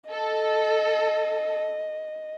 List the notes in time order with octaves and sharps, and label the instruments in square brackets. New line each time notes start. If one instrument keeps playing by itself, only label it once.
[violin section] A4 [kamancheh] D#5